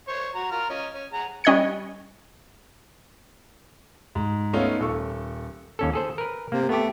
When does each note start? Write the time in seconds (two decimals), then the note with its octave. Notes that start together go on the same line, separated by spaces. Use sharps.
0.08 C5 C#5 C#6
0.35 F#4 A#5
0.51 F4 A#5 F6
0.70 C#4 D#5
0.95 C#4
1.13 G#4 F#5 A#5
1.44 G3 C#4 D#5 F#6 G#6 C#7
4.15 G#2
4.53 A3 B3 C#4 D#4 F4
4.80 D#1 A4 C#6
5.79 D#2 C#4 A4
5.93 G#4 A4 C5
6.18 A#4 B4
6.52 C3 A#3
6.69 A3 B3 G4